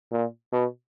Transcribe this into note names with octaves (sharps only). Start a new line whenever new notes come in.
A#2
B2